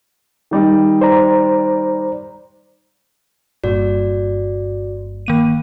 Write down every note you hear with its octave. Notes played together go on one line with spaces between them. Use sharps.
D#3 G3 D#4
C5 D5 A#5
G1 G2 A#2 F#4 D5
D#3 A#3 D#7